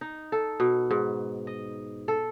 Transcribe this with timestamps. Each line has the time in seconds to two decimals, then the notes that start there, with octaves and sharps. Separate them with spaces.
0.01 D#4
0.32 A4
0.60 B2
0.91 G#2
1.47 D#5
2.08 A4